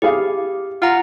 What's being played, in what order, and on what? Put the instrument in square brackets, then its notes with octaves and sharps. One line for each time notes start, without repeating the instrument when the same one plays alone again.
[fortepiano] E4 G#4 F5 [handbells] G4
[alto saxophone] F4 [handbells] F#5 A#5